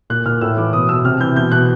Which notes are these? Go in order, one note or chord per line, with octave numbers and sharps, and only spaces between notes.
A#2 F#6
A#2 F6
A2 E6
E3 D6
B2 D#6
B2 E6
C3 F6
E3 G6
B2 G6
B2 F#6